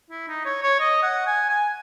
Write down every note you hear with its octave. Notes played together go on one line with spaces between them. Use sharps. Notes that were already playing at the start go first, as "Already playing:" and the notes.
E4
D#4
C#5
C#5
D#5
F#5
G#5
G#5